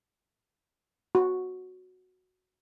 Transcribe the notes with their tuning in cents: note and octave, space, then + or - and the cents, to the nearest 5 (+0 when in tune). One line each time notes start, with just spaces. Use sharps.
F#4 -5